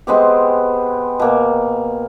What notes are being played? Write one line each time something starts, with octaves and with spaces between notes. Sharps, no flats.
G#3 B3 C4 G4
B2 A#3